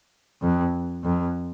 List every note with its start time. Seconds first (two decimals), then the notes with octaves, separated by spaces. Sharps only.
0.42 F2
1.04 F2